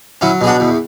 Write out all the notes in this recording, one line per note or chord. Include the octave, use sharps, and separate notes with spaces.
F#3 C#4 E4
B2 G#4
D4 F#4
E2